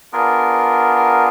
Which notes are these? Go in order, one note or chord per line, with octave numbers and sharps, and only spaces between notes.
B3 D4 F4 G#4 A#4
A#4